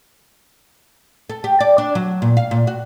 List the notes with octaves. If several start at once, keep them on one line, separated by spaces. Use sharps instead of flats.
A4
G4
D5
D4
F#3
A#2
F5
A#2
F#4